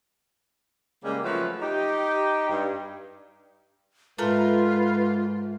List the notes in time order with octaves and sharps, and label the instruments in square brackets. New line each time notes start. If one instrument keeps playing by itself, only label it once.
[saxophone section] C#3 G3 G#3 A#3
F3 F#3 A3 C#4 B4
D#4 G4
G2
[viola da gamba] G#2 [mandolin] A3 A#4 [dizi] F4 [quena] B4